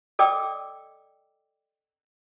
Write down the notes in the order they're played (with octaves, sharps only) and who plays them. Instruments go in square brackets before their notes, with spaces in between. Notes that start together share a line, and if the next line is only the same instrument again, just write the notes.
[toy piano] A4 D5 D#5 G5 D6 E6